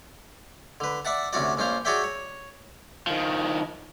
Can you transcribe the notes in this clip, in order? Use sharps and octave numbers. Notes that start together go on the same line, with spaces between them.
D3 B4
D5 E5 F#5 A5
D2 C3 C#4 F#4 D5
A#1 C#4 D4 C5 F5
F#4 G#4 C#5 D5 E5 G5
C#5
D#3 F3